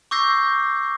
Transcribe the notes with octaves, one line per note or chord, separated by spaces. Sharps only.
C#6 D6 E6 G6 A#6 C7